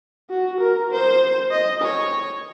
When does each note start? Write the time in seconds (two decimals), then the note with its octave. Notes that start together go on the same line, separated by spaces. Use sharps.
0.30 F#4
0.61 A#4
0.92 C5
1.51 D#5
1.82 C#5